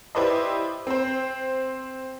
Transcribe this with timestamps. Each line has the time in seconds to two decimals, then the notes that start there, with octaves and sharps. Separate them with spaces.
0.15 E4 G4 B4 C5 D5 D#5
0.87 C4 C5